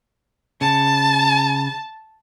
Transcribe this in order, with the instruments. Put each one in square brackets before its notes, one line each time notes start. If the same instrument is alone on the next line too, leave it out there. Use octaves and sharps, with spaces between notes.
[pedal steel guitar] C#3 [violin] A5